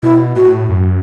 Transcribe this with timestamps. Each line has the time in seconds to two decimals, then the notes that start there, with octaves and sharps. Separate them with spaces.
0.03 B2 E4
0.36 A2 F#4
0.70 F#2